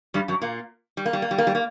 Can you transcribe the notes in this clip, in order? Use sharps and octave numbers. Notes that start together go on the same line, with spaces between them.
G2 G3
F#2 F#3
A#2 A#3
G3
A#3
G3
A#3
G3
A#3
G3
A#3